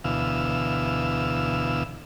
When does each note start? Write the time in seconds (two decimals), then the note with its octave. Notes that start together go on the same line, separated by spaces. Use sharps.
0.04 D2 B2 E3 F5 E6